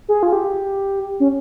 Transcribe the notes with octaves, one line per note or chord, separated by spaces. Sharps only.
G#4
F4
G4
C#4